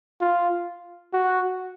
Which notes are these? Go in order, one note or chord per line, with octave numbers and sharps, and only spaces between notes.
F4
F#4